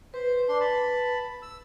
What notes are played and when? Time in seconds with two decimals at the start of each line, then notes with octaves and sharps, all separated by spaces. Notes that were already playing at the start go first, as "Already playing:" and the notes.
0.14 B4 C5
0.49 D4 C6
0.60 A5 B5
1.42 E6